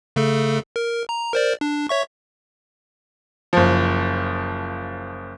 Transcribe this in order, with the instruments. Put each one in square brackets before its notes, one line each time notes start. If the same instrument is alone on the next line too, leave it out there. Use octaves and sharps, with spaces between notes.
[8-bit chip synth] C#3 A3 A4
A#4
A#5
A#4 C5 D5
D4
C#5 E5 C#6
[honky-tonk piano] F#1 F3